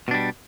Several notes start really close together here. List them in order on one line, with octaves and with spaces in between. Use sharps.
B2 D4 G3